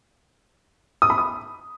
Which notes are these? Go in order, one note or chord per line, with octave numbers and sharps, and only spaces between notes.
D#6
B5
D#6